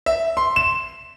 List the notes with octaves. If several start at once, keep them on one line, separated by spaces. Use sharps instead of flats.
E5
C6
E7